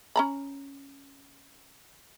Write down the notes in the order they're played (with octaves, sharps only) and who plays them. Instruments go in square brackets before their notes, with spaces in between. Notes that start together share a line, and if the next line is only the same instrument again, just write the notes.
[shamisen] C#4 A#5 B5